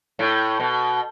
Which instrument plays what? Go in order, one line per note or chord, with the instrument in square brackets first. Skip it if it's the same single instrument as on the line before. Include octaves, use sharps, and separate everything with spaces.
[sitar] A2
B2